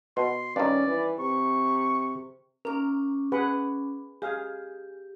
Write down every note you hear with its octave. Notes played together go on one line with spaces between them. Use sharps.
B2 C6
G2 D#3 C#4 D5
E3
C3 C#6
C#4 A#4 D6
G#4 B4 F#5
G4 G#4 F5